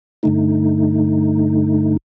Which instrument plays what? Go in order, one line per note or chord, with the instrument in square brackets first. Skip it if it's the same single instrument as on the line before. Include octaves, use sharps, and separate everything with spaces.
[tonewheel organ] G2 D3 A3 D#4